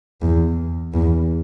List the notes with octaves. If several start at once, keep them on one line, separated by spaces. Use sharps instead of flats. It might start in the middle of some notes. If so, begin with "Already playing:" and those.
E2
E2